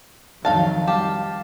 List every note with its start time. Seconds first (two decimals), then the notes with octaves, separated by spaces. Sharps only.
0.45 F2 D#3 F#3 D#4 F5 A5
0.88 G3 G4 F5 A5